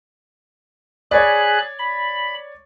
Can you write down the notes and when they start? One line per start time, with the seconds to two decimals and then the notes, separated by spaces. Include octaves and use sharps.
1.11 G#4 C#5 D5 B5 F#6
1.79 B5